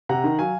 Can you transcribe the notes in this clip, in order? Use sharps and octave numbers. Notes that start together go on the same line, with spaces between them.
C3 F#5 A#5
D#3
F#3 F5 G#5